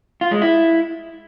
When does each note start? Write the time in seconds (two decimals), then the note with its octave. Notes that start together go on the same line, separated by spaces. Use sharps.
0.21 F4
0.31 G#3
0.41 E4